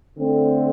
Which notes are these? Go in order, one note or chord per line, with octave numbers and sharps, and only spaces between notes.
D3 A3 C4